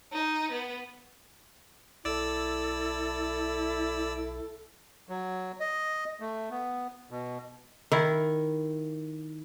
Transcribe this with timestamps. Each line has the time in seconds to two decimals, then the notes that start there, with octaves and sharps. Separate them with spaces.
0.13 D#4
0.52 B3
2.05 B1 E4 A4 D5 E6
5.09 F#3
5.60 D#5
6.20 A3
6.51 B3
7.11 B2
7.92 D#3 E4